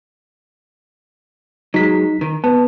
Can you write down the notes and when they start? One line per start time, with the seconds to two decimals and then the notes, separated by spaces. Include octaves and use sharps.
1.74 F#3 G#3 D#4 B6
2.21 D#3
2.44 B3 A5